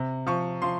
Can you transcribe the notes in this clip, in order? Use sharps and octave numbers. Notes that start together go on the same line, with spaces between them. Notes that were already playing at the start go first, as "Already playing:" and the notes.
Already playing: C3
F3 C#6
F3 C6